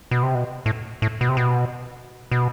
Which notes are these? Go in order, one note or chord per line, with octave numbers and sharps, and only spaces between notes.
B2
C3
B2
A2
A2
B2
C3
B2
B2